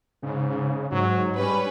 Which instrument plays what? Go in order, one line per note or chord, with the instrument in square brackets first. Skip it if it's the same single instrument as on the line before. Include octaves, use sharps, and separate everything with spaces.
[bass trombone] G#2 [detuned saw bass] C#3
[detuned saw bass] G#2 [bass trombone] F#3
[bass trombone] G3 [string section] C#4 B4